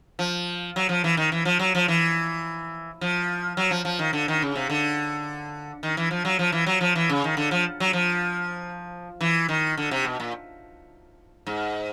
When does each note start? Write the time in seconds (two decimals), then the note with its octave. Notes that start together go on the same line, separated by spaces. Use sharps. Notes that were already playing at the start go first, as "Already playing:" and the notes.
0.19 F3
0.76 F#3
0.89 F3
1.04 E3
1.17 D#3
1.32 E3
1.45 F3
1.59 F#3
1.75 F3
1.88 E3
3.01 F3
3.57 F#3
3.71 F3
3.85 F3
3.99 D#3
4.13 D3
4.28 D#3
4.42 C#3
4.56 C3
4.70 D3
5.83 D#3
5.97 E3
6.11 F3
6.25 F#3
6.39 F3
6.52 E3
6.66 F#3
6.81 F3
6.95 E3
7.09 C#3
7.24 D#3
7.37 D3
7.51 F3
7.80 F#3
7.93 F3
9.21 E3
9.49 D#3
9.77 D3
9.91 C3
10.05 B2
10.20 A#2
11.47 G#2